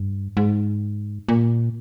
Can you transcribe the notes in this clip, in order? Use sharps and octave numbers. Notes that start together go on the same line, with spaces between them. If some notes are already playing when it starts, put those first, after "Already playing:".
Already playing: G2
G#2
A#2